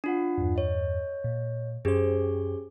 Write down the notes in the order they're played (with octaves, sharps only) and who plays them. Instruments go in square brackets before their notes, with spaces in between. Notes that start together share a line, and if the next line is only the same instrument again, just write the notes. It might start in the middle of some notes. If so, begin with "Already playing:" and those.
[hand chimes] D4 F4 F#5
[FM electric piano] E2 G2
[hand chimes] C#5 D#5
[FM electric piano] A#2
[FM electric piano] F#2 C5 [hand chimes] C#4 G4 G#4